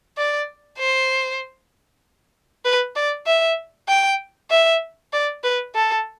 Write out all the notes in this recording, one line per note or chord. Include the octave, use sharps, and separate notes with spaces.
D5
C5
B4
D5
E5
G5
E5
D5
B4
A4